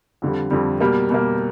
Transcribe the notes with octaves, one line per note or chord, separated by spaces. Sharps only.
F2 D3 G3
F2 D3 G3
B2 G3 A#3
B2 G3 A#3